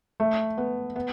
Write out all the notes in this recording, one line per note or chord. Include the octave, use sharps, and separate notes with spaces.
A3
B3
B3